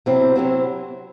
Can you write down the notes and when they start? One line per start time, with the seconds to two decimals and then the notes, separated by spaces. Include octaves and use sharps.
0.06 C3 F#3 C4 E4
0.35 C3 F#3 C4 E4